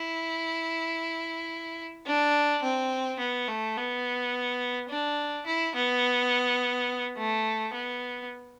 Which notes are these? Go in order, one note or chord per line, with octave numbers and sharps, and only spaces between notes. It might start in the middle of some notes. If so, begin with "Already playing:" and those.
Already playing: E4
D4
C4
B3
A3
B3
D4
E4
B3
A3
B3